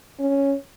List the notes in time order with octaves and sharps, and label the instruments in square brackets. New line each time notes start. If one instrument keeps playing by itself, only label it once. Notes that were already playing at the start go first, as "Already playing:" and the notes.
[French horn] C#4